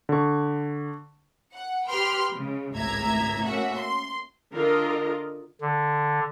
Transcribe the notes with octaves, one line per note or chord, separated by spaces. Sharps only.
D3 C#6
F#5
G4 B4 G5 B5 C6 F6
C#3 G#3
G#1 C#2 A2 E5 A#5 G#6
A3 A#3 C#4 F#4 E5 F#5
C6
D3 F4 A#4 D#5
D3